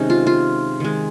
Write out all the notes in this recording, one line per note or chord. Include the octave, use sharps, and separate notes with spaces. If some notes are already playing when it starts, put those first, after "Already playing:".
Already playing: C3 D#3 G#3 C#4 D#4
F4
F4
D#3 G#3